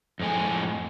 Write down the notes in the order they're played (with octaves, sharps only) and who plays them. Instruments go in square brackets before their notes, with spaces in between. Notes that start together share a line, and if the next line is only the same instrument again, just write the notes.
[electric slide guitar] F2 A2 G#3 G#5